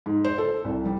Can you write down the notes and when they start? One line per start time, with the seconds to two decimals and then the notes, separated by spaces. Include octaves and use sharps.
0.06 G#2
0.24 C5
0.38 A4
0.64 C2
0.85 G3